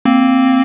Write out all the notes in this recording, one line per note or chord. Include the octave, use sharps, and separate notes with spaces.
A#3 C4